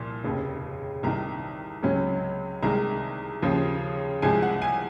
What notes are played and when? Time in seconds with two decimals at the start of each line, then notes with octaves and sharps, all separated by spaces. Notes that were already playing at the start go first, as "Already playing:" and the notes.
Already playing: C2 A#2 F3
0.24 F1 D#2 C#3
1.03 C2 C3 D#3 A#5
1.83 C#2 C3 F#3 C#4
2.63 C2 C3 D#3 G#3 A#5
3.42 D#2 C#3 F3
4.22 C2 C3 F3 G#3 G#5
4.42 F#5
4.62 G#5